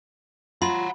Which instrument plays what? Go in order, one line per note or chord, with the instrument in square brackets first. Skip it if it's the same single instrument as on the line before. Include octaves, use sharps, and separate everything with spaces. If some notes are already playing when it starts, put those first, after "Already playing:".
[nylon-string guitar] F4 [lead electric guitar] F#5 A#5 [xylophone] B5